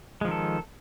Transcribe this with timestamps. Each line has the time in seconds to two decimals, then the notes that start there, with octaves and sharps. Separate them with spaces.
0.21 G#3
0.25 F3
0.28 D#3
0.31 A4